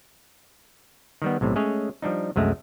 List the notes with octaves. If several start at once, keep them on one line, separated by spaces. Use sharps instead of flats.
D#3 G3 B3
B1 A2 C3
G#3 A3 C#4 G#4 C#5
F3 G3 D4 D#4
C2 F#2 G#3 A3